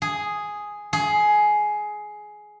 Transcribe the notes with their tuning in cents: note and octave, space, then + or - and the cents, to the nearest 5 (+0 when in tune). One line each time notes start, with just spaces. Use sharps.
G#4 +0
G#4 +15